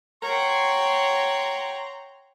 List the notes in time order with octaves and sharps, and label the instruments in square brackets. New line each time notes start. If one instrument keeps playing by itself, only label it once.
[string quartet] C#5 F#5 G5 [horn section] A#5 C6